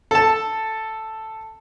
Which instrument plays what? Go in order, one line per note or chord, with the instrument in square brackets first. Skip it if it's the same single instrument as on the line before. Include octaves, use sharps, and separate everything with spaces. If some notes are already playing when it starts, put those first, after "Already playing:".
[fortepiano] A4 A5